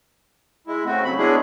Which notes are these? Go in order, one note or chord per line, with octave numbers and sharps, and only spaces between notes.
G#3 E4
C#3 A3 C4 F#4
F#3 B5
G#3 B3 C#4 D4 E4 G#4